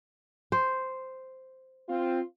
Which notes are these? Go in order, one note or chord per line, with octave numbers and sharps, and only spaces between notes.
C5
C4 F4